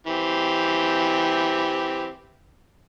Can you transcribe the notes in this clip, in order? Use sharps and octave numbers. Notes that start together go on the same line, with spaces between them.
E3 C4 G4